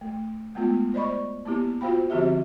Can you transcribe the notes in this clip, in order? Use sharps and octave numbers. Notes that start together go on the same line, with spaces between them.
A3
G#3 A3 B3 F4
C5 D5 D#5 B5 C#6
A#3 B3 E4 G4
F4 F#4 C5 F5 G5 B5
D3 F3 C4 F#4 G4 E5